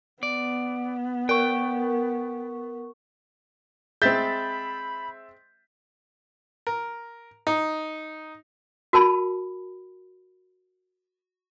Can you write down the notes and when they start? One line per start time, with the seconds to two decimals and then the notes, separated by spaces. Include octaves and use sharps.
0.23 B3 D5
1.29 A#4 G5 C#6
4.02 G#3 C4 E5 B5 G6 A6 B6
6.67 A#4
7.47 D#4
8.93 F#4 A#4 A5 B5